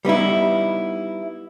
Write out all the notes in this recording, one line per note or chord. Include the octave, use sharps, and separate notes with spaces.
G3 B3 D#4 E4